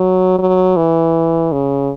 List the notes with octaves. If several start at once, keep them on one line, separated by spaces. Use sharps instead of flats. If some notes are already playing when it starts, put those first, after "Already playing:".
Already playing: F#3
F#3
E3
C#3